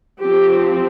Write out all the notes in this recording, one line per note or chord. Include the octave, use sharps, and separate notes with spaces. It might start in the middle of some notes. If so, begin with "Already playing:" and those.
F3 C4 G4